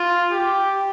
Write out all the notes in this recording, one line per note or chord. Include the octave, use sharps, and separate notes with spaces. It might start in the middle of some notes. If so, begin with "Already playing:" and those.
Already playing: F4
G4